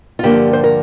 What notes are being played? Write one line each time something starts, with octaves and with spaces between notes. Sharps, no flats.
F4
G2 D3 F3 A#3 G4
C5
A#4